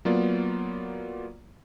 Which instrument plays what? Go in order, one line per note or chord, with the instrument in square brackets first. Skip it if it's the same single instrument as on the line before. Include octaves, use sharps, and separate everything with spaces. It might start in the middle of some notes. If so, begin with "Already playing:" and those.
[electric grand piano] F#3 A#3 B3 F4 D5